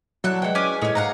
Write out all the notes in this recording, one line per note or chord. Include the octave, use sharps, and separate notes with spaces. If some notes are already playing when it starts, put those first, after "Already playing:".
F#3 D4 E4 A4 F#6
E3 G#3 F#5 G5
C#4 G#5 D6
A2 G#3 D#4 C#5
G#2 F5 F#5 A#5